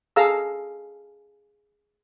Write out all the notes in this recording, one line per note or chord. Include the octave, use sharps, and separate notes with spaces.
G#4 A4 F5 A#5 E6